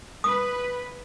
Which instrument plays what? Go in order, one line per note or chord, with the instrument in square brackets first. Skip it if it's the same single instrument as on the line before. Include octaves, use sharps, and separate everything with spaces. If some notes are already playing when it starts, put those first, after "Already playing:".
[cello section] B4 [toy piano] D#6